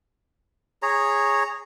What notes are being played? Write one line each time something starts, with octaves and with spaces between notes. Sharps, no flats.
G#4 C#5 A#5